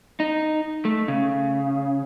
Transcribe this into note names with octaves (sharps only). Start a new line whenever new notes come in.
D#4
A3
C#3